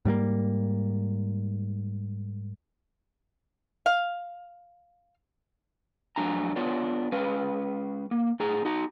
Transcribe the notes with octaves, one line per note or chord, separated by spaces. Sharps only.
G#2 G3 A3 A#3
F5
F2 F#3 A3 D4 G#5 A#5
B3 D4 F4 A4 C#5
G#3 C#4 B4 F5
A#3
A2 G#4 A#5
D#4 F#4 A#5